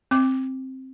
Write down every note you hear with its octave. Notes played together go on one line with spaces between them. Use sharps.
C4 D6